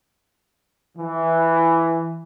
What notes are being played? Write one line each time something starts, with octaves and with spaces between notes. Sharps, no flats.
E3